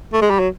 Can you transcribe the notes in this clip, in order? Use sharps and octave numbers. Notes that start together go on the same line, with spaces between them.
A3
G#3
G3
F#3